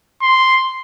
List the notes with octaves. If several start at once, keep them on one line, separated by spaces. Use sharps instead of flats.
C6